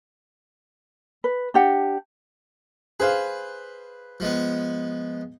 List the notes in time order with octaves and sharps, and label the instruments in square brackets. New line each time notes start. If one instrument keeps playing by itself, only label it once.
[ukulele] B4
D4 G4 F#5
[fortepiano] G#4 C5 F5 [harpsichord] B4
[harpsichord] F3 G#3 B3